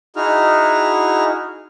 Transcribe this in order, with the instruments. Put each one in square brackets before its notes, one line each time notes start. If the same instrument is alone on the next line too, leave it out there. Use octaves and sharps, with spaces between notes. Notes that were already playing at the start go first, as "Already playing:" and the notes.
[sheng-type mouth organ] D#4 E4 F#4 G#4 F6